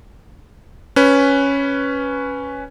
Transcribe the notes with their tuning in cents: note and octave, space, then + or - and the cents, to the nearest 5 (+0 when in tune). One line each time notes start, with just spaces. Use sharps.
C#4 +0 B4 +0